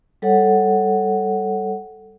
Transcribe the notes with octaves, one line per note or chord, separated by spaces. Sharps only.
G3 A4 C#5 F#5